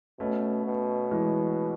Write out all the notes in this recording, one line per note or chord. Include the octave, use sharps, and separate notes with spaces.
B2 A3 C#4
B2
E3 G#3